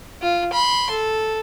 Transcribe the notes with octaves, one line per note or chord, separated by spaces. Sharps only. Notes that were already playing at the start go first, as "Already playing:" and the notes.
F4
B5 C6
A4